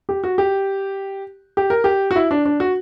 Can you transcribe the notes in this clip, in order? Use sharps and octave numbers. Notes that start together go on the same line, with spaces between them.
G4
F#4
G4
G4
A#4
G4
F#4
E4
D4
D4
F#4